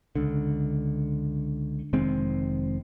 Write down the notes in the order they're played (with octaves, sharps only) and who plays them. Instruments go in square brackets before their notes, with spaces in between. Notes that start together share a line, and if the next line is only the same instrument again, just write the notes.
[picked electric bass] C#2 D3
F1 D#3 G#3 C4